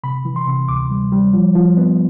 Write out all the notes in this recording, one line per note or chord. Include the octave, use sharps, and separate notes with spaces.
C3 B5
E3
C6
C3
D2 D6
G3
G3
F3
F3
B3